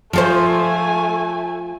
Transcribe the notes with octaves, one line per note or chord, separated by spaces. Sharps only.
F3 A3 A4 C5 G#5